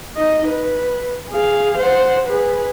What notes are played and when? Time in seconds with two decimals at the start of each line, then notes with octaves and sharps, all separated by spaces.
0.17 D#4 D#5
0.47 B4
1.30 G#4 F5
1.78 C5 F#5
2.28 G#4 B4